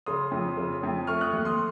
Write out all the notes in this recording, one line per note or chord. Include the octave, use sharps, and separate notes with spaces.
C#3 C6 D#6
F2
C#3
F2
A3 C#6 F6
D#6 F#6
D#2
C6 D#6